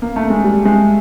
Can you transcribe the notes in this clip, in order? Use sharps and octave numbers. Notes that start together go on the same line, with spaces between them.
A#3
A3
G#3
G3
G#3